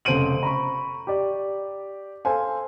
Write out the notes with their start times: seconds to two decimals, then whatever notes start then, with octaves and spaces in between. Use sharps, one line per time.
0.05 F1 C#3 C5 D7 D#7 F#7
0.43 A#5 B5 C#6
1.07 G4 D5
2.25 A4 C5 F5 G#5